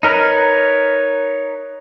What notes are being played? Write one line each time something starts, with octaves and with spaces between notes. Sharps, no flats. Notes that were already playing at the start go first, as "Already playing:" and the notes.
D#4 A#4 B4 C#5